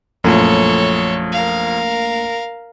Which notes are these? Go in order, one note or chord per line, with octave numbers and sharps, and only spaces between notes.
A#1 F#2 F3 A3 A4 C#5
A#4 F5